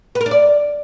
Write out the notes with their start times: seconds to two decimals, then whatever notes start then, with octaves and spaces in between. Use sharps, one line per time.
0.15 B4
0.21 A#4
0.26 D4
0.31 D5